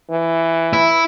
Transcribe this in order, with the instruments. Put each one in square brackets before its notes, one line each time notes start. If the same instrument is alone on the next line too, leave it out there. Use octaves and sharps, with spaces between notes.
[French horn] E3
[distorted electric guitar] E4